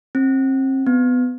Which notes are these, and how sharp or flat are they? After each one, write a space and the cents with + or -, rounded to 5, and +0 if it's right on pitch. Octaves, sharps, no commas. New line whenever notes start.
C4 +35
B3 +20